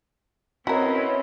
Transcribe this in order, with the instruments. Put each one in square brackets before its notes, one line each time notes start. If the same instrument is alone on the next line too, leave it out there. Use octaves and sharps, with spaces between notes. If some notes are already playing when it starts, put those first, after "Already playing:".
[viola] C4 C#4 [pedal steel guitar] E4 [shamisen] F#4 A#4 [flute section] B4 C#5 D#5